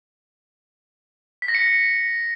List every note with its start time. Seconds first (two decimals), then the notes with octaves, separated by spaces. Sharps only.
1.42 B6
1.48 A#6
1.55 C#7